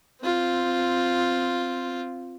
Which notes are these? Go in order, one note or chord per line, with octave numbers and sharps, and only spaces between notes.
C4 F4